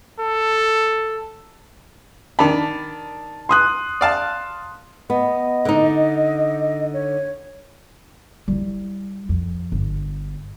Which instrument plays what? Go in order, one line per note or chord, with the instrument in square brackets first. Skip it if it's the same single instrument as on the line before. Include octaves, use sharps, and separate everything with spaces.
[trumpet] A4
[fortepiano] D#3 D4 B5 [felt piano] A5
[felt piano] C6 D#6 F#6
[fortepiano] D5 F5 A5
[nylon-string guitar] B3 [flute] D#5
[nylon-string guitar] D3 D#4
[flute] C#5
[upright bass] G3 E4
F2
G1